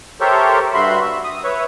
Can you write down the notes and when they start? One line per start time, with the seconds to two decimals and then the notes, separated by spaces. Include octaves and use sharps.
0.21 G4 A4 A#4 C5 C#5 E5
0.74 G2 F#4 E5 B5 C6
1.01 E5
1.24 D#6
1.44 B4 C#5 E5